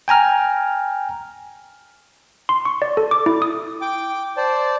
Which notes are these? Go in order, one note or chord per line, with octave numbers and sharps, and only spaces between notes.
G5 G#5 A#5 F6
C6
C#6
D5
A4
D6
E4
D#6
G5 D6
C5 D5 A5